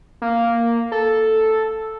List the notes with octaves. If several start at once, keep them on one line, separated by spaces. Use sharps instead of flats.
A#3
A4